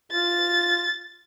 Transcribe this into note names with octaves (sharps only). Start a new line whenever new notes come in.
F4 A6